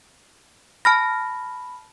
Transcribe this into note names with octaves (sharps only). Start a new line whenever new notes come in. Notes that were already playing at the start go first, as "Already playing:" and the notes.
A5 B5 F6 A#6